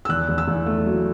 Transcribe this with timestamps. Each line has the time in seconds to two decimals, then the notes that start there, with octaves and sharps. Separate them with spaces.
0.05 E6
0.09 E2 F#6
0.29 E2
0.38 E6
0.48 E2
0.66 A3
0.86 F#3